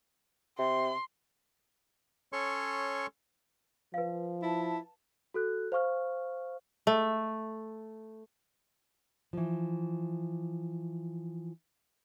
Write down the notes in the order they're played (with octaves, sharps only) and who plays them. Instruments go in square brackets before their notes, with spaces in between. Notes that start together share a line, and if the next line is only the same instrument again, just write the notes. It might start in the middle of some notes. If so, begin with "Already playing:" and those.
[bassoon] C3 [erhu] C6
[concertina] C#4 A4 C#5 C6 C#6
[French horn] F3 [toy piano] B4 F5
[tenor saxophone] E4 [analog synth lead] A5
[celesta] F#4 A4 F#6
C5 F5 C#6 F6
[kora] A3
[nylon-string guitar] E3 F3